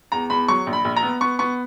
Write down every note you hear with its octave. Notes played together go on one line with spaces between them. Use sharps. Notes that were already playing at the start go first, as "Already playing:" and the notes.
E2 A#5
E2 B5
F#3 C#6
A#1
B5
A#1
A#5
B3
B3 C#6
B3 C#6